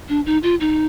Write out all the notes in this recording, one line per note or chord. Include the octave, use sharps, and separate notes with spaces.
D4
D#4
F4
D#4